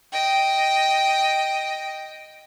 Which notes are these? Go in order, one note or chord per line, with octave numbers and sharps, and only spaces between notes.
D#5 G5